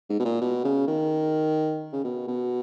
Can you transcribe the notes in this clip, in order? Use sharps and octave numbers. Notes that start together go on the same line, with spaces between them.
G#2
B2
A#2
B2
C#3
D#3
C#3
B2
B2